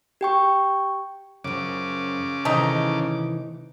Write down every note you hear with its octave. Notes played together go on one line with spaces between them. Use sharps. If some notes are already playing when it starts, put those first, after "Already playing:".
G4 G5 C#6
F#2 C#3 F3 D6
C3 D#3 E3 A3 D#4